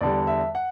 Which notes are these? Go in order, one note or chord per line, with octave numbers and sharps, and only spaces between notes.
E2 D3 G3 D5
E5
F#5